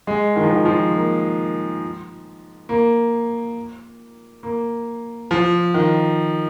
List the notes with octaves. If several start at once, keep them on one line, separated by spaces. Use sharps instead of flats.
G#3
D#3
F3
D#3
F3
A#3
A#3
A#3
F3
D#3